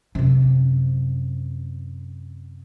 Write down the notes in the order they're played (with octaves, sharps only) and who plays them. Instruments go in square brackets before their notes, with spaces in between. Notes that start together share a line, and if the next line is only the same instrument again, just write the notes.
[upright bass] F#2 C3